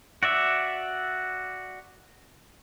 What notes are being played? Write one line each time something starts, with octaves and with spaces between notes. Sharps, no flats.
F#4 D5 E5